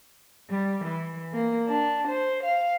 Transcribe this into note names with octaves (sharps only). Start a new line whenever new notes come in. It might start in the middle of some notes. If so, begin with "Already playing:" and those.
G3
E3
A#3
D4
C5
F5